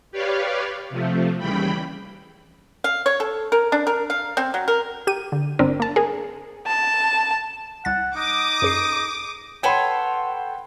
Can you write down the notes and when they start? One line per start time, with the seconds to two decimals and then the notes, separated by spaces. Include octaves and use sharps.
0.12 G4 B4 C#5 D5 F5
0.90 C3 F3 A3
1.39 D#2 C#3 E3 G3 G5 B5
2.84 F5
3.06 C#5
3.20 A4
3.52 A#4
3.72 D4
3.87 A#4
4.10 F5
4.37 C4
4.54 F#3
4.68 A#4
5.07 G4 D#7
5.32 D3
5.59 G1 C4 D4 A#4
5.80 A#3 A5
5.96 G#4 A#4
6.67 A5
7.85 C2 F#5 A6
8.16 D#4 D6 D#6
8.62 F#2 G#4 C7
9.63 A4 B4 C#5 F#5 G5 B5 C6